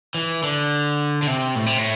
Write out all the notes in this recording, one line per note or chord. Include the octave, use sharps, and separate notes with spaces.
E3
D3
D3
C3
A2
C3
A2